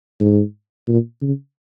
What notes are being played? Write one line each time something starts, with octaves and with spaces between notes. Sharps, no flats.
G#2
A#2
C#3